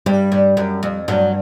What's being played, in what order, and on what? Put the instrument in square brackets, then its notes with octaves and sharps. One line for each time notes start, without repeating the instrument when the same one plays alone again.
[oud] G2 [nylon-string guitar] G3
[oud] G2
F#2
F2
[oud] G2 [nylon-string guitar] F#3